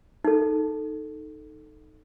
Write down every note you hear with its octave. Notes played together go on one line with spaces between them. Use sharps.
D#4 A4